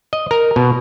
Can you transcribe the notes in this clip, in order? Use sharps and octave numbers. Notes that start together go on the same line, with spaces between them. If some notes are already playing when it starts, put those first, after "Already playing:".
D#5
A#4
B2